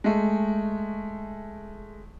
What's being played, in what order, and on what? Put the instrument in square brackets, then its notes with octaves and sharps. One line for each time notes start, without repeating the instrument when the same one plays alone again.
[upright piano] G#3 A3